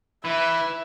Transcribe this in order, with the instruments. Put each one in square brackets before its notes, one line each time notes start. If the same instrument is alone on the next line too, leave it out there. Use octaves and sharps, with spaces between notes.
[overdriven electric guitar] E3 [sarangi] E5 [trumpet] B5